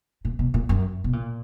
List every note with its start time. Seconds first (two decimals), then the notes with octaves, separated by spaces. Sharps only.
0.25 A#2
0.39 B2
0.54 A#2
0.69 F#2
1.04 B2
1.13 A#2